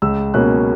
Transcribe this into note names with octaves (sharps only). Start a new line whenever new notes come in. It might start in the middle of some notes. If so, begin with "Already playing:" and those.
C#2 E6
B2 A#3 C#4 F#6